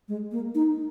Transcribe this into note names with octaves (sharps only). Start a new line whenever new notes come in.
G#3
A#3
D#4